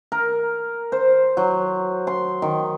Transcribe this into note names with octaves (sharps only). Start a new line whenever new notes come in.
A#4
C5
F#3
C6
D#3